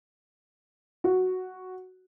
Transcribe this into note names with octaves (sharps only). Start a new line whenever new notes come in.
F#4